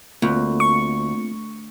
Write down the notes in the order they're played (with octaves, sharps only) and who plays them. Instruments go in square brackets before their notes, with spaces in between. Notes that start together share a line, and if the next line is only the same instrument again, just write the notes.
[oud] D2 [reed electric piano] A#3 C4 F4
[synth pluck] C#6